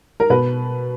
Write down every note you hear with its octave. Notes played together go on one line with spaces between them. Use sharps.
A#4
B2 B4